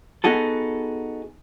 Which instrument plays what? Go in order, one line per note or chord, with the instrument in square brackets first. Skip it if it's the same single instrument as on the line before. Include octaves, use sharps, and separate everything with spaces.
[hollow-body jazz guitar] B3 D#4 F#4 G#4 A4